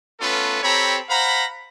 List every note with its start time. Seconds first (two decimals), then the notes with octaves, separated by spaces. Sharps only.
0.20 A3 B3 C#4 F4 A4 B4
0.63 C4 G4 A4 C#5 A#5 B5
1.09 C5 F5 F#5 A#5 B5